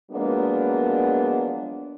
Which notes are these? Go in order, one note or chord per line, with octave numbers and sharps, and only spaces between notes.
F3 F#3 G#3 A#3 B3 D4